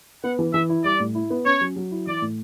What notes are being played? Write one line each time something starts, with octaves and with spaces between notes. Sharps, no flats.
B3 F#5
E3
E3 E5
E4
G3 D5
A2
E4
B3
C#4 C#5
F#3
F#3
E4
E3 D5
A2